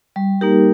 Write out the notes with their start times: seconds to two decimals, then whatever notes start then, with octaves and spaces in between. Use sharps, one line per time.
0.16 G3
0.41 A#3 D#4 G4 A#4